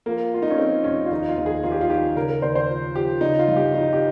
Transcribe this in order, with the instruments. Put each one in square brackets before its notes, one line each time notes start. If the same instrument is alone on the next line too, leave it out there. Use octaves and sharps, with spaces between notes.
[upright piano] F3 A#3
F3 F4
D#4
C#4
F3 C4
F1 C#4
F4
D#2 D#4
F4
D#2
G#4
D#2 F4
G4
F4
D#3 G4
C#3 A#4
A#4
D#2 C5
C5
F3
F3 G4
C#3 D#4
F4
G1
G4
F3 D#4
G4